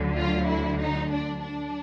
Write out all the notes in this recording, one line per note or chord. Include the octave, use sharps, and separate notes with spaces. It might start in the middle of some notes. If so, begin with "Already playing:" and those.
Already playing: D2 D3 F#3
F4
E4
D#4
D4
D4